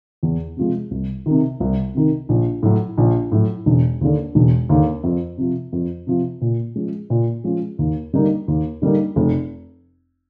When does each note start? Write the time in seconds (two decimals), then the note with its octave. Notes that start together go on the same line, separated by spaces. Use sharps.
0.23 E2
0.57 C3 F3 G#3
0.91 C2
1.26 C3 D#3
1.60 C2
1.94 C3 D#3
2.29 A#1
2.63 A2 F#3
2.98 A#1
3.32 A2 F#3
3.66 E1
4.01 D#2 D3
4.35 E1
4.69 D#2 D3
5.03 F2
5.38 C3 F3
5.72 F2
6.07 C3 F3
6.41 A#2
6.76 F3 G#3 C#4
7.10 A#2
7.44 F3 G#3 C#4
7.79 D#2
8.13 D3 G3 A#3 D#4
8.48 D#2
8.82 D3 G3 A#3 D#4
9.16 F1